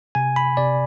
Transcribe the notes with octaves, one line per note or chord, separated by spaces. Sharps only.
C3 G#5
B5
C3 D5